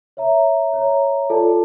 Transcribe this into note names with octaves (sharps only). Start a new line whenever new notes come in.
C#5 E5 A#5
C#5 E5 A#5
F4 A4 D5 A5